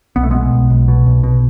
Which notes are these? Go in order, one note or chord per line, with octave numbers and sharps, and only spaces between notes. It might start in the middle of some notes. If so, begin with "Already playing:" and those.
B1 B3
A3
B2 G#3 B3
B1
B1
B2
B1
B2